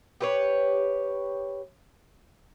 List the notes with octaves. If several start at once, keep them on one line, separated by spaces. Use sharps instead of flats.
G4 B4 C#5